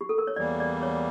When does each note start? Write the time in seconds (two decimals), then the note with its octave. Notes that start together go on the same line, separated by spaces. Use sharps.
0.01 G4
0.09 A4
0.18 A#4
0.27 C#5
0.36 E2 E3 G3 A#3 D5
0.60 D5
0.83 C#5